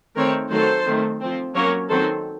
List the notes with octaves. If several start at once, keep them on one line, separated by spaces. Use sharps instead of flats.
D#3 A3 C4 A#4 C#5
D#3 F#3 A3 A4 C5
D#3 A3 C4
F3 C4
F#3 A#3 C#4 A#4 C#5
D#3 F#3 C4 A4 C5